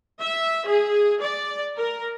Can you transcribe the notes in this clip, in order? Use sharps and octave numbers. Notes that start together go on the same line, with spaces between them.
E5
G#4
D5
A#4